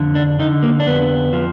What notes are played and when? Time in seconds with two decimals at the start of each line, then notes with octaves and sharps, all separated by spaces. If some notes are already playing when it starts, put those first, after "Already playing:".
Already playing: F2 D3
0.15 D4
0.39 D3 D#4
0.63 A#3
0.80 D4
0.86 F2 B3
1.33 F3